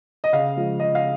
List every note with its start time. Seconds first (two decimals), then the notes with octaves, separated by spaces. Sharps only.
0.24 D#5
0.32 C#3 F5
0.56 F3 G#3
0.80 C#3 D#5
0.95 F5